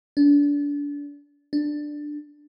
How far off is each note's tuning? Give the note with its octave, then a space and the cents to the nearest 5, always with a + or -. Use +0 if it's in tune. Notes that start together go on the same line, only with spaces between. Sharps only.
D4 -30
D4 +10